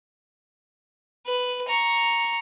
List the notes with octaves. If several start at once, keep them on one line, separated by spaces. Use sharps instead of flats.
B4
A#5 C#6